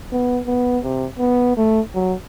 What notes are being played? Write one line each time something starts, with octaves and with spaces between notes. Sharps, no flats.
B3
B3
C3
B3
A3
F#3